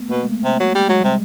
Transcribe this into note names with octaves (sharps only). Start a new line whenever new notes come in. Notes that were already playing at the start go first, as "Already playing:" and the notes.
Already playing: A3 B3
B2 A#3
G#3
A3
C3
F#3
G3
F#3 G#3
C3 G3